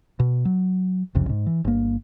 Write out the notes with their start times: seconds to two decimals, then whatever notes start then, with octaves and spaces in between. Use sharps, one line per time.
0.20 B2
0.45 F#3
1.15 F#1 C2 F2 C#3
1.29 G#2
1.46 E3
1.64 G1 A#3